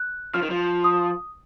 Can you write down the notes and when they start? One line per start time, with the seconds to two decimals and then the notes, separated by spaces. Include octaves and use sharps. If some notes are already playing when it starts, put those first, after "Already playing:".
Already playing: F#6
0.34 F3 F6
0.42 D#3
0.50 F3
0.84 D#6